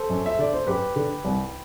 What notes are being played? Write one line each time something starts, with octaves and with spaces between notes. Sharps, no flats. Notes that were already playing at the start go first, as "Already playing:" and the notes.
Already playing: A4 C5
F#2
E5
D3 D5
C5
F#2 G4 B4
D3
C2